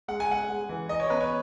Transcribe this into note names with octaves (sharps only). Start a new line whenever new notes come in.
G#3 F#5
G#5
G#3 F#5
G#3
E3
E3 D#5
C#5
B3 B4
C#5